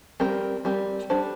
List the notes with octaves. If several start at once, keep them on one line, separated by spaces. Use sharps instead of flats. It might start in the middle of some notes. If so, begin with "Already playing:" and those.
G3 C4 G4 A#4
G3 C4 G4 A#4
G3 D4 A4 C5